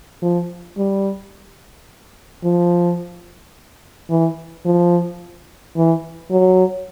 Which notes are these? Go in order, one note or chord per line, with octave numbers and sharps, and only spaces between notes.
F3
G3
F3
E3
F3
E3
F#3